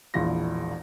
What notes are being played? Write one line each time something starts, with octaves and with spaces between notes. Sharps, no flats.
E1 A#1 E2 E4 F4 A#6